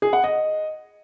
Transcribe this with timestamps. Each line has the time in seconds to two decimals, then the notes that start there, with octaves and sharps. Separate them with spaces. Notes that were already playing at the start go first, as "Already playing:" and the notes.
0.02 G#4
0.13 F#5
0.24 D#5